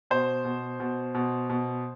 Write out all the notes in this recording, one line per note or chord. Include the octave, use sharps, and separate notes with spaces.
B2 C5
B2
B2
B2
B2